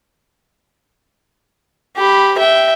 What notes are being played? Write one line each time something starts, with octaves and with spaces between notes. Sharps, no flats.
G4 B5
E5 G5